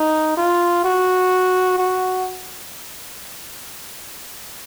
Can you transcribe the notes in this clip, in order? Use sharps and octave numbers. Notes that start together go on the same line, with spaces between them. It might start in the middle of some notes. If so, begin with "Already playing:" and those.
Already playing: D#4
F4
F#4
F#4